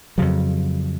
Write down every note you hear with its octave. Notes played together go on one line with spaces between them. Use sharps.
F2 C#3 F#3